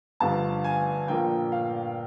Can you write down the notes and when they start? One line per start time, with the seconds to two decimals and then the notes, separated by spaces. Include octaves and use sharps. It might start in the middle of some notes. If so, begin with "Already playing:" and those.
0.20 G1 G2 D3 F3 A5
0.64 G#5
1.08 A#1 A#2 F3 A#3 G5
1.52 F5